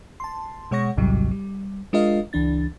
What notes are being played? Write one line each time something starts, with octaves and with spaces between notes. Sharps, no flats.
A5 C6
B2 G#3 C#5 F#5 C#6 A#6
A1 D2 G#2 C3 F#3 G3
G3
G#3 D4 F4 A#4 D#5 F5
C#2 E3 D4 A6